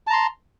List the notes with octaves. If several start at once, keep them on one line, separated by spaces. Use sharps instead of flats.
A5 A#5 C6